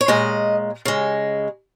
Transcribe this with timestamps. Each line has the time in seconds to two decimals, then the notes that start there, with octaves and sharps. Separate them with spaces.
0.01 C#5
0.08 A#2 G#3 D#5
0.85 C#3 G#3